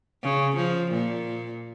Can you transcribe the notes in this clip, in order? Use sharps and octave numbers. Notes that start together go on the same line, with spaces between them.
C#3
F3
A#2